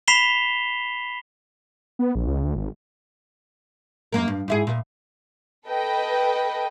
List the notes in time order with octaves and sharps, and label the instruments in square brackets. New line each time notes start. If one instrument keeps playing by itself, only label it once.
[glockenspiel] B5 B6 C7 E7 F7 G7
[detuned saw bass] B3
A#1
C#2
D2
G#1
[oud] F#2 A#3 A#4
G2
G#2 E4 G#4
A#2
[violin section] A4 B4 D#5 G5